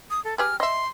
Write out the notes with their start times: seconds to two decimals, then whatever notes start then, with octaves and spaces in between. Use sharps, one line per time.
0.10 D#6
0.25 A4
0.38 G4 G#4 B4 F6
0.60 D#5 E5 C6